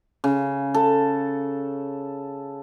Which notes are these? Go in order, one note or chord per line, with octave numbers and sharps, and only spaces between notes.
C#3
A4